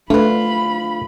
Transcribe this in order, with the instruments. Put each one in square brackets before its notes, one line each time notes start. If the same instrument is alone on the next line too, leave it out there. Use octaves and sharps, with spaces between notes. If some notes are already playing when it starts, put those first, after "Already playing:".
[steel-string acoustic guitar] D2 F4 [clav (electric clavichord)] A3 B4 [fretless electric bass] D4 [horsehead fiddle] B5